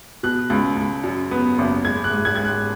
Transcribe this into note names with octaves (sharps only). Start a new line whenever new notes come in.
B2 F#6
C#2
C#2
F#2
B3
F#1
G#3 G#6
F#6
G#2
G#6
G#2 G#6
F#6